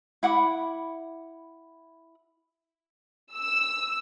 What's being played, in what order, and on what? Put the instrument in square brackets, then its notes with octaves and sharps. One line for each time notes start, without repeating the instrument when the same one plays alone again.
[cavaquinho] E4 F#5 B5 D6
[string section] E6